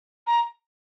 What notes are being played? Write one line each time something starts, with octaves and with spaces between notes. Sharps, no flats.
A#5